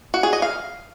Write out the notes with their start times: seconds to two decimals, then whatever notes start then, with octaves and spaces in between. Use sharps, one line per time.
0.14 F#4
0.23 G#4
0.33 D#5
0.42 F5